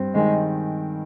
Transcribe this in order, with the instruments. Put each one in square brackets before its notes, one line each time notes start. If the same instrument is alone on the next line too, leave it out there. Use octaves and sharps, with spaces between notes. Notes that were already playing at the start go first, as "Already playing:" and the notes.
Already playing: [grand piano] G2 C4
[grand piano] D#3 [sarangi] G#3